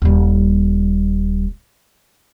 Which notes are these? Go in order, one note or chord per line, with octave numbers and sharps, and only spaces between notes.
D#1 G3